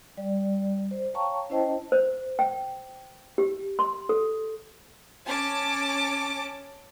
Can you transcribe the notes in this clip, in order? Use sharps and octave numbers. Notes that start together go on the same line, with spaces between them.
G3 D5
C5
C#5 F5 G5 A5 A#5 C#6
C#4 E4 C5 D#5 G5 A5
C5
G5
G4
C6
A4
C#4 A5 D6